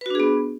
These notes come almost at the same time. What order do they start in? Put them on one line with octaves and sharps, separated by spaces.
B4 F#4 D4 G#4 B3